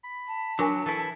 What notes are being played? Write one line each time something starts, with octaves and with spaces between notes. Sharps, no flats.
B5
A5
F#3 D4 A#4 G#5
E3 E4 A4